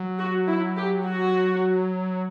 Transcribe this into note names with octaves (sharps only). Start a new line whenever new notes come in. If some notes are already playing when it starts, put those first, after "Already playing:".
Already playing: F#3
F#4
E4
G4
F#4